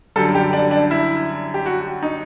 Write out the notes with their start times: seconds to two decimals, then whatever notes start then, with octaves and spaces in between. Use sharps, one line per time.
0.16 F#2 D3 G3 A4
0.35 G4
0.53 D4
0.71 D4
0.91 E4
1.54 G4
1.66 F#4
2.03 D#4